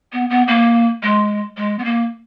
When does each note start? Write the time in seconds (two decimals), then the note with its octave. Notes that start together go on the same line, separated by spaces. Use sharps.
0.13 B3
0.30 B3
0.48 A#3
1.03 G#3
1.57 G#3
1.79 B3
1.84 A#3